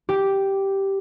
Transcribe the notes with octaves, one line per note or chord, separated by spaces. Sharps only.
G4